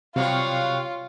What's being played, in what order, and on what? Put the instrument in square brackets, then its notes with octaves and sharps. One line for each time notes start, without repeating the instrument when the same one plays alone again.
[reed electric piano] C3 [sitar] F#3 G3 C#5 [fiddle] F4 [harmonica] F5